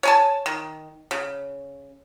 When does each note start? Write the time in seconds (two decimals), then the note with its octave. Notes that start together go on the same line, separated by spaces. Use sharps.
0.03 C#5 G#5 A5
0.46 D#3
1.11 C#3